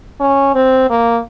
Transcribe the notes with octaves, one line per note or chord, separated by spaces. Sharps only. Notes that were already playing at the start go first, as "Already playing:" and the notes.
C#4
C4
A#3